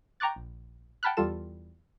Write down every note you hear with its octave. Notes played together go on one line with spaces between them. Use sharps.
G5 A#5 C#6 D6 F#6 A6
A#1
F#5 G5 A5 B5 F6 F#6
E2 G3 F4 A4 E7